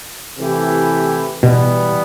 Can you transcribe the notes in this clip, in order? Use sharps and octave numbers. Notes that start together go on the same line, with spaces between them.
C3 E3 A3 E4 G4
B2 E3 G3 B3